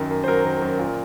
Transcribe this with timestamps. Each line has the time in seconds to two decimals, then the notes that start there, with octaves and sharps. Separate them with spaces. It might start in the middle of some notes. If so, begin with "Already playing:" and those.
Already playing: F#2 D#3
0.11 F#2
0.24 C5
0.28 F#3 A#4
0.45 D#3
0.62 F#2
0.79 A#2